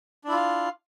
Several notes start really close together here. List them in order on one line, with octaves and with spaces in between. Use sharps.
D4 E4 F4 F5